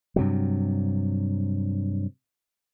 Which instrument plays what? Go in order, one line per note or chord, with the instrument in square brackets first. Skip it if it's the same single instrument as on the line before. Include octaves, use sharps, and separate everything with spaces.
[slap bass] G2 C3 F#3